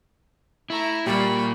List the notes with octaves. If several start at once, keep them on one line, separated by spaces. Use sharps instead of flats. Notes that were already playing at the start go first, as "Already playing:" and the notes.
A3 E4 A#5
A#2 G3 A#3 G4 B5 C#6